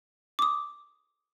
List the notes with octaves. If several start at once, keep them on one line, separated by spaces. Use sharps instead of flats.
D6 D#6